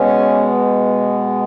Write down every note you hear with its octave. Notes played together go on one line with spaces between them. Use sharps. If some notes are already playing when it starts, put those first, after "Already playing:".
Already playing: B2 G#3 B3 C#4